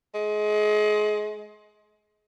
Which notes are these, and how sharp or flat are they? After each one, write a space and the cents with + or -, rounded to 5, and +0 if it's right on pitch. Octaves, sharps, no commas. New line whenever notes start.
G#3 +25